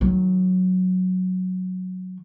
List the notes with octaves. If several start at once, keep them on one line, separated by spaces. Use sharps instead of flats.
D#3 F#3